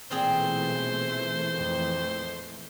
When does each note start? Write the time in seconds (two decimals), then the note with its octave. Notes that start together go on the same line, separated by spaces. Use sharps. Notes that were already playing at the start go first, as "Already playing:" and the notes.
0.11 B1 A#2 E3 A3 C4 G#4 C5
1.55 F2